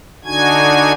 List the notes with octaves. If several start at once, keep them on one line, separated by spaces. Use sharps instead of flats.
D3 D4 D#4 F#4 G#5 G#6